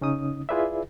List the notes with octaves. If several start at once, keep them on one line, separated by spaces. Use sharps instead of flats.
C#3 C#4 D#4 D#6
E4 F4 G#4 B4 D5 E5